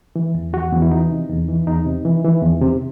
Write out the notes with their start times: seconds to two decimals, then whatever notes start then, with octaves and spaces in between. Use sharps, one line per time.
0.16 E3
0.35 E2
0.53 E2 F#4
0.72 E2
0.82 E4
0.91 E3 D#4
1.10 C3
1.29 E2
1.48 E3
1.67 E2 D#4
1.85 C3
2.05 E3
2.24 E3
2.43 E2
2.62 C3